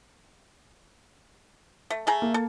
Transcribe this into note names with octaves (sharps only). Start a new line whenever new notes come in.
A3
A3 G#4 A#5
A#3
A4